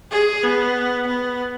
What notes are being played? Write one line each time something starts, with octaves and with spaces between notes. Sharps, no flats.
G#4
B3
B3